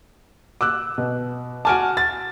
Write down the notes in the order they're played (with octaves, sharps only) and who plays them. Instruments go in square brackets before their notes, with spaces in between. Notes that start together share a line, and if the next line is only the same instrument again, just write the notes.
[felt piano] D6 E6 F#6
B2
[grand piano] F#4 G#5 A5 [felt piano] D6 F6 D7
[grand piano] A6